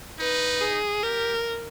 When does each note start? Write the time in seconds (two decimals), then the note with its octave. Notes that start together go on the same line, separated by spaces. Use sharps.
0.19 D#4 B4
0.61 G#4
1.03 G4 A#4